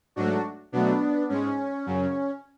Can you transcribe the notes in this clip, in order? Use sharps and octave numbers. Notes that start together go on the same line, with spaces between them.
G#2 F#3 A3 D4 F#4
B2 F#3 A3 B3 D4
G#2 G#3 C#4
F#2 C#3 F#3